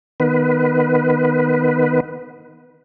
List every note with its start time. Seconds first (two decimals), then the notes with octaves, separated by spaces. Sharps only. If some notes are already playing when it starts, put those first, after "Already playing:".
0.20 D#3 B3 B4